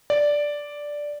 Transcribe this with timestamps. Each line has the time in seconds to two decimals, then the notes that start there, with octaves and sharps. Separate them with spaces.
0.10 D5